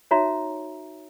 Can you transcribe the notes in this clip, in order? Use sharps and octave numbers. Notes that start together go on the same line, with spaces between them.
D#4 F#4 C#5 E5 A#5